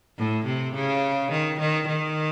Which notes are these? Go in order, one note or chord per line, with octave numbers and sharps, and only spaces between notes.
A2
C3
C#3
D#3
D#3
D#3